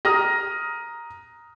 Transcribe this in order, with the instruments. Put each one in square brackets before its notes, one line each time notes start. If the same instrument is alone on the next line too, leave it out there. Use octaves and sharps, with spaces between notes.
[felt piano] A#5 D#6 F6 A#6